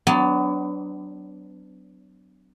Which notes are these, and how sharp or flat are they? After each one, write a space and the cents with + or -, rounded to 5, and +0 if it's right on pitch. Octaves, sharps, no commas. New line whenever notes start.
F#3 +25 B3 +35 D4 +0